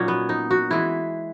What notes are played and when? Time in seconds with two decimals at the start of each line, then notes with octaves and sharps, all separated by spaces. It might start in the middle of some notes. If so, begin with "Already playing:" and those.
Already playing: A#2 F#3 C#4 D#4
0.08 B3
0.29 D#4
0.51 F#4
0.71 E3 G#3 E4